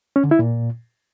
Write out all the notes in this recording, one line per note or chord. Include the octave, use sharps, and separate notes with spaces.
C#4
D3
E4
A#2